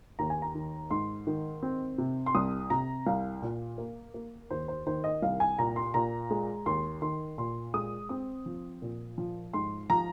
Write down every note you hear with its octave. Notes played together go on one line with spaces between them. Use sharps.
D#2 A#5
G#5
A#5
D#3
G#2 C6
D#3
C4
C3
C6
C2 D#6
C3 A#5
C2 F5
A#2
A#3
A#3
D#2 C5
C5
D#3 C5
D#5
C2 F5
G#5
A#2 A#5
C6
A#2 A#5
G#3
D#2 C6
D#3 C6
A#2 C6
G#3 D#6
C4 D#6
F3
A#2
F3
G#2 C6
F3 A#5